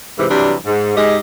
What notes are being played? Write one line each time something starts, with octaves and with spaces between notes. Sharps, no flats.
G#2 C3 E3
C3 E3 F#3 G3 D4
G#2
G#2 G#3 G4 D#5